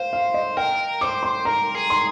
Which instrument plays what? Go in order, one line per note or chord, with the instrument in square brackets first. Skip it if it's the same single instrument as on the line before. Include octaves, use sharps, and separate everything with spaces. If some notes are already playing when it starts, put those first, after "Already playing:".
Already playing: [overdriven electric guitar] C5 [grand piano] F5
[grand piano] F5
D#5
[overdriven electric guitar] A#4 [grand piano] G5
[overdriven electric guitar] C5 [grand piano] D6
[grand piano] C6
[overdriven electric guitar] A#4 [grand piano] A#5
[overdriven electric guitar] G#4
[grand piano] C6